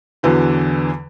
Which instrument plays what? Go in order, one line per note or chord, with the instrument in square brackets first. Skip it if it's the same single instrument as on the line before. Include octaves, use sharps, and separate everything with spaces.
[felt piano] E2 D3 E3 F#3